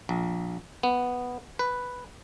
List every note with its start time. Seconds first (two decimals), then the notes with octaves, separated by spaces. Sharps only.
0.09 A#1
0.83 B3
1.59 B4